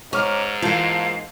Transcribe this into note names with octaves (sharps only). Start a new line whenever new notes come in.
G#2 C#4 A#5 C#6 D6 F6
E3 A#3 F4 F5 A5 G6